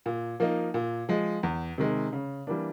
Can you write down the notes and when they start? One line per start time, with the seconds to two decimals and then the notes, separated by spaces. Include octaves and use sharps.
0.06 A#2
0.40 F3 A#3 D#4
0.74 A#2
1.09 F3 G#3
1.43 E2
1.78 C3 D#3 G#3
2.13 C#3
2.47 E3 G3 A#3 D4